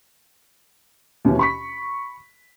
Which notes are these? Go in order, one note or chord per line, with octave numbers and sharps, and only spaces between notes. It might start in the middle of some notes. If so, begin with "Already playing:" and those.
D#2 B2 E3 C#4
B5 C#6 B6